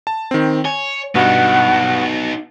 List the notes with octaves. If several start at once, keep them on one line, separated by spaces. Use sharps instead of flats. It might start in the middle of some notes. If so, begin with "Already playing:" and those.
A5
D#3 C4
C#5 G#5
G2 B2 B3 D#4 F#5